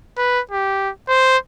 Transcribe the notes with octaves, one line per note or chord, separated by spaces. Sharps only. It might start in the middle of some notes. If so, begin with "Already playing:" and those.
B4
G4
C5